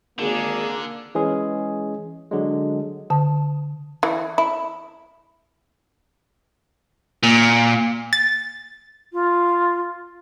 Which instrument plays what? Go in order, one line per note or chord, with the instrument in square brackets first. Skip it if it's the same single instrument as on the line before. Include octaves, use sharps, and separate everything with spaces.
[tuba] G#1 [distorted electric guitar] D3 [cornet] A#3 [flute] G#4
[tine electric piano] E3 G#3 C#4 G#4
D3 F#3 G#3
[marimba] D3 A5
[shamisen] E3
E4
[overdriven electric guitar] A#2
[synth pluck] A6
[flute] F4